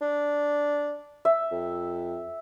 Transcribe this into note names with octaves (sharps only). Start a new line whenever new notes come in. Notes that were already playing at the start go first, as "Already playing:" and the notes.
D4
E5
F2